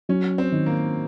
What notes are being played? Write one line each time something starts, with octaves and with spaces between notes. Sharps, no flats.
F#3 C#4
C4
D#3
A#3